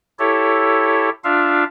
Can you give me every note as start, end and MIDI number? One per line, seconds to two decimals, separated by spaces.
0.19 1.09 64
0.19 1.09 67
0.19 1.09 69
0.19 1.09 73
1.24 1.64 62
1.24 1.64 65
1.24 1.64 76
1.24 1.64 77